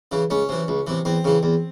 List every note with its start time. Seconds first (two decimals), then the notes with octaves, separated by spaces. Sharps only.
0.12 C#3 E3
0.30 C#2 C#4
0.49 C3 E3
0.68 C#2
0.87 C3 E3
1.05 E2 C4
1.25 C#3 E3
1.43 E2